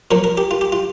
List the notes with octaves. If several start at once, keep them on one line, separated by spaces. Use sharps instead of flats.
A#2 F3 A#4
A#4
G4
F4
G4
F4